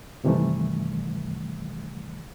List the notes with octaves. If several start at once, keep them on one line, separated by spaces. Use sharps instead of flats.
G2 C3 D#3 E3 G3 A3